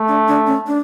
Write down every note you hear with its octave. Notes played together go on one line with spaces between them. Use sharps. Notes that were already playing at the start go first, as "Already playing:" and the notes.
Already playing: A3
D4
D4
C#4
D4